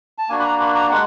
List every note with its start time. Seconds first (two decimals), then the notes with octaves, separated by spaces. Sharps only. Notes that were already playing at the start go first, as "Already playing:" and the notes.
0.18 A5
0.29 A#3 D4 F#4 G#5
0.39 B5
0.44 A#5
0.60 B5
0.75 A#5
0.91 G#3 F#5